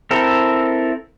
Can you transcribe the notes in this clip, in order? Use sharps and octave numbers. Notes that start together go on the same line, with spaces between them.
C4 E4 A4 A#4